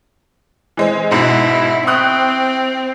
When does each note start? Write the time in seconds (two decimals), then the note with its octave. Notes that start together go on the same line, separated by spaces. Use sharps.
0.77 E3 G#3 C4
1.11 G#2 B2 E4
1.87 C4 C#6 D#6 F#6